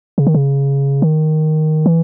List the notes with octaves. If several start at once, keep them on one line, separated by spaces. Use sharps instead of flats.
C#3
D#3
C#3
D#3
E3